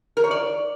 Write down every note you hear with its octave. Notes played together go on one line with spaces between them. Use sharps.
A#4
C#5
D5